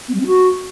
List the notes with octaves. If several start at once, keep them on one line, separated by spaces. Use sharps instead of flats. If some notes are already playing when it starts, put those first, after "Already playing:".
B3
G3
C4
F#4